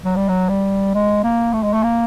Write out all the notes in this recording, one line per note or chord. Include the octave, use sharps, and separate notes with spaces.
F#3
G3
F#3
G3
G#3
A#3
A3
G#3
A3
A#3